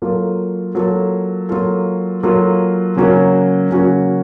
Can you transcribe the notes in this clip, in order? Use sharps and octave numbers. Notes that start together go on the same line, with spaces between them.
F#3 A#3 F4 A4
F#3 A#3 F4 A4
F#3 A#3 F4 A4
F#3 A#3 F4 A4
C#3 F#3 A#3 C#4 F#4
C#3 F#3 A#3 C#4 F#4